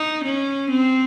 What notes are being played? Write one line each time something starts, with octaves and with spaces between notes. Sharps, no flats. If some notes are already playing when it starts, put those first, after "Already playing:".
Already playing: D#4
C#4
C4